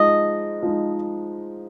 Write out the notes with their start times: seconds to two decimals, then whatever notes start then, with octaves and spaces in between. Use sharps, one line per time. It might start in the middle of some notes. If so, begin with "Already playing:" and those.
Already playing: F3 G#3 D#4 D#5
0.62 F3 G#3 D#4